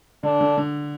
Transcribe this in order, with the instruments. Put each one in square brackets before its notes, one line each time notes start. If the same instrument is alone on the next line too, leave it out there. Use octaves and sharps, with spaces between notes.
[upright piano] D3 [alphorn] D4
[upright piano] D3
D3